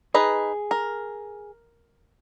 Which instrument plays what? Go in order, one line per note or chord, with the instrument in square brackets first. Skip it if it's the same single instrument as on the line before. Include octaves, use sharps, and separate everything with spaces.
[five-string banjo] D#4 B4 D#5 [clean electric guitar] G#4
[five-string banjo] A#4